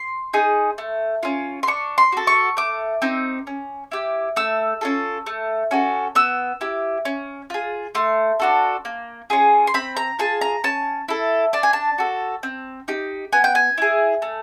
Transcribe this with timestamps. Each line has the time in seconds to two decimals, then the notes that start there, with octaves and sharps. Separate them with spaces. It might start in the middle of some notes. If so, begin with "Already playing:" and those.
Already playing: C6
0.33 D#4 G#4
0.78 A3
1.23 C#4 F4
1.63 C6
1.67 D4 C#6
1.98 C6
2.12 F#4 A4
2.27 C#6
2.57 A3 D6
3.02 C4 D#4
3.47 C#4
3.91 E4 G4
4.36 A3 E6
4.81 C#4 F4 A4
5.26 A3
5.71 C#4 F#4 A4
6.15 B3 E6
6.61 E4 G4
7.05 C#4
7.50 F4 G#4
7.95 A3 C6
8.39 D4 F#4 A4
8.85 A#3
9.30 C#4 F4 G#4
9.67 C6
9.74 C4 B5
9.97 A#5
10.19 F4 G#4 A5
10.41 A#5
10.64 C#4 A5
11.08 E4 A4
11.53 D4 A5
11.63 G#5
11.73 A5
11.98 F#4 A4
12.43 C4
12.88 D#4 G4
13.32 B3 G#5
13.44 G5
13.55 G#5
13.78 E4 G#4
14.22 A3